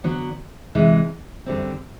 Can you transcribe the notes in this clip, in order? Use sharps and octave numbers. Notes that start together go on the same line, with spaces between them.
D3 F#3 B3
D2 C3 E3 G#3
F#2 D3 G3 C4